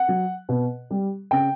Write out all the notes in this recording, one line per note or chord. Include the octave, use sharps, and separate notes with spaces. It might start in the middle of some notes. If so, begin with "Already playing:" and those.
Already playing: F#5
F#3
B2
G3
C#3 G5